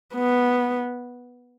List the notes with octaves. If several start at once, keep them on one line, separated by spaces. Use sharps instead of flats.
B3